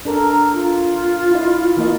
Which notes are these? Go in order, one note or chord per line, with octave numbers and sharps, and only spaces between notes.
D4 A4 A#4
A#5
F4
E4 D#5
E3 A#3 D#5